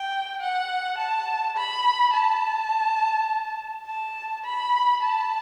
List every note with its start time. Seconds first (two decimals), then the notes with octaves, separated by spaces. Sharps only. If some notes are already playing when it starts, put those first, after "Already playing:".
Already playing: G5
0.40 F#5
0.98 A5
1.56 B5
2.13 A5
3.86 A5
4.45 B5
5.02 A5